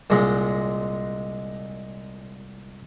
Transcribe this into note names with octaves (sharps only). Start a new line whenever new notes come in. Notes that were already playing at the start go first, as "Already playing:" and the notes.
C2 A#2 G#3